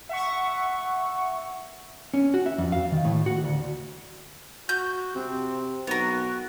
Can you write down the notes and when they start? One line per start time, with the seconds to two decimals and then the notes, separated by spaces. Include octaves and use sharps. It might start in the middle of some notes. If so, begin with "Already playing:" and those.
0.09 E5 F#5 C#6
2.14 C#4
2.34 F#4
2.46 E5
2.58 F2
2.72 F5
2.92 D#3
3.05 A2
3.26 F#4
3.44 D2
4.69 F#4 G6
5.15 C3 C4
5.87 B1 B3 F#4 A#4